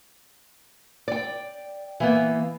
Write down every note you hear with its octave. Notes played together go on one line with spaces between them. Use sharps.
D5 G5
E3 A#3 B3